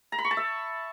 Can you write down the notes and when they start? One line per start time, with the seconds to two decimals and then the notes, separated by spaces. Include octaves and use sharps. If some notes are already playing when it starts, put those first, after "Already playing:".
0.12 A#5
0.18 B5
0.25 C#6
0.31 A5
0.37 E5